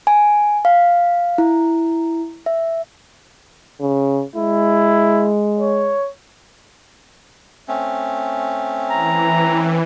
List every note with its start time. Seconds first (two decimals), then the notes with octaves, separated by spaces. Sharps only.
0.07 G#5
0.65 F5
1.38 E4
2.46 E5
3.81 C#3
4.36 G#3 E4
5.59 C#5
7.68 A3 C4 C#4
8.90 E3 A#5